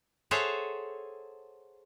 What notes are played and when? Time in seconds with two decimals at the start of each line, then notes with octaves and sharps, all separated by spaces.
0.31 G#4 A4 C5 C#5 E5 F#5